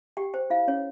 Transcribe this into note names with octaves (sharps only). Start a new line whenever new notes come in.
G4 G5
C5 G5
E4 F5
C#4 C#5